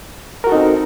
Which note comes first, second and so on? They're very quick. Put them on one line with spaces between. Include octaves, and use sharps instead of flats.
A#4 F#4 A4 D#4 C4